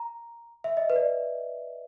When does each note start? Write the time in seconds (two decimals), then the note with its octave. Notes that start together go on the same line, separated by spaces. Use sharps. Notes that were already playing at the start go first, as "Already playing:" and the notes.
Already playing: A#5
0.64 E5
0.77 D#5
0.90 B4
0.96 D5